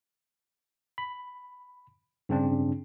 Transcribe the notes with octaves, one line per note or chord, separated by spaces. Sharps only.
B5
G2 C#3 C4 D4